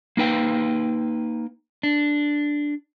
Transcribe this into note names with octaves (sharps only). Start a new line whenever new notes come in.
A#3 D#4 B4 G5
D4